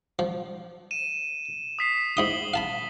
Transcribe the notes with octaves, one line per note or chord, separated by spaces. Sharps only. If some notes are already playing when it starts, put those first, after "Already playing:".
F3
D#7 E7
D#6 B6 C7
G#2 E4 D#6 B6 F#7 G7
F5 A5 B5